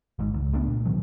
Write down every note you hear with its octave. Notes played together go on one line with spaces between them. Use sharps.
G#1 G#2
C#2
C#2 A3 B3 D4
A#2
B2 D#3 E3 F#3